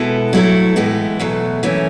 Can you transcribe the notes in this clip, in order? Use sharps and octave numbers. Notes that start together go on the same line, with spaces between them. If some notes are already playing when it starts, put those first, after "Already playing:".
Already playing: B2 G#3 B3 E4 A4
F#3 A3 E4 A4
A2 E3 G#3 B3
E2 B2 F#3 A3
F#2 E3 A3 C#4